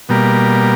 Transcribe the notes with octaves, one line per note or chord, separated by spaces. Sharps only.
B2 G3 A#3